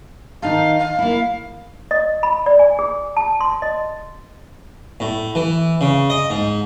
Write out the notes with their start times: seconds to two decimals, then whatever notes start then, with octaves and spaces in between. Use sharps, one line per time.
0.42 D#3 D#4 A4 F5
0.79 F5
0.99 A#3 E4
1.91 D#5
2.23 B5
2.46 D5
2.59 G#5
2.79 G#4
3.17 A5
3.41 C6
3.62 D#5
5.00 A2
5.35 E3
5.81 C#3
6.10 D#5
6.30 G#2